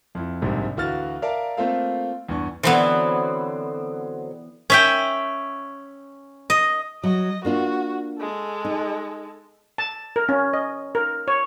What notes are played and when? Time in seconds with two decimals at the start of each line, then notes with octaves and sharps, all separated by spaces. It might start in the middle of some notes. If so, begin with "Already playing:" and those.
0.15 F2 E4
0.42 A#1 G#2 C3 G3
0.77 D2 E3 F#4 F5 F6 A6
1.22 A#4 D5 E5 F5 A5 A#5
1.57 A3 A#3 C4 F4 A4 F5
2.29 E2 G2 C#6
2.63 D3 E3 F#3 B3 C4
4.70 C#4 E5 G5
6.50 D#5
7.03 F#3 D#5
7.45 A#3 D4 F4 F#4
8.18 G#3 A4
8.65 D#4
9.78 A5
10.16 A#4
10.29 C#4
10.53 D#5
10.95 A#4
11.28 C#5